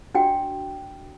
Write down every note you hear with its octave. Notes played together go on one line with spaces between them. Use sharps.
D4 F#4 D5 G5